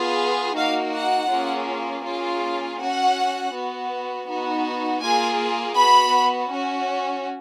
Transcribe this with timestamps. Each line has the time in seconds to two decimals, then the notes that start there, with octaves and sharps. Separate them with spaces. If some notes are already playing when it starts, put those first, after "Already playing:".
Already playing: B3 F4 G#4
0.56 A#3 D#4 F#4 F5
0.94 F#5
1.30 A#3 C#4 F4 G#4
2.05 A#3 C#4 F4 G#4
2.80 C#4 F#4 F#5
3.54 B3 F#4
4.29 B3 D#4 F#4
5.02 A#3 F4 G#4 G#5
5.77 B3 F#4 B5
6.51 C#4 F#4